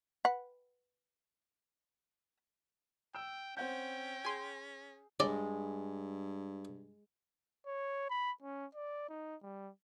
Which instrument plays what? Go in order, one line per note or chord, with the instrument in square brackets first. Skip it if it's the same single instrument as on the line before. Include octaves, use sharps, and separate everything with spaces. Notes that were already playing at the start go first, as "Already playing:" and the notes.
[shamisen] B4 F#5
[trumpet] G5 [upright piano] E6
[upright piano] C4 F#5 G6 [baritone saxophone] C#4 [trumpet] G5
[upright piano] G#4 [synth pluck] G#5 C6
[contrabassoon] G2 [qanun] G#3 [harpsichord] D5
[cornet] C#5
B5
C#4
D5
D#4
G3